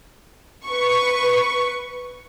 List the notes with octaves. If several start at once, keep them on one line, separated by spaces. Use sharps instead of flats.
B4 C#6